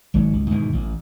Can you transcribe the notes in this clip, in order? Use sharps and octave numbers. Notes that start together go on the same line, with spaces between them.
G#1 G#2 F#3
C#2
G#2 B2 D#3 E3
A1